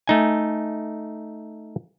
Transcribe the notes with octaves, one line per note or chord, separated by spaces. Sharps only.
A3 D#4 G#5